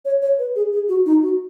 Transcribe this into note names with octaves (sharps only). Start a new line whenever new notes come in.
C#5
C#5
B4
G#4
G#4
F#4
D#4
F#4